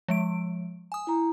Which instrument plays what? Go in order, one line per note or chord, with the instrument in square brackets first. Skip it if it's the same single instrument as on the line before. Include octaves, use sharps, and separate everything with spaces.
[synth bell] F3 G#3 D7
G#5 D#6
[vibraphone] E4 A#5